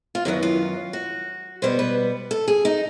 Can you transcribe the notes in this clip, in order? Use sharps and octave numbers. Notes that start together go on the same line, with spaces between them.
F4
F#2 D#3 F#3 B3 E4
F4
F#4
B2 G3 B3 C5
B4
A4
G#4
D#4